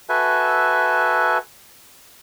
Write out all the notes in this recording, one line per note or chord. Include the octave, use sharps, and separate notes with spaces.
F#4 A4 B4 E5 G#5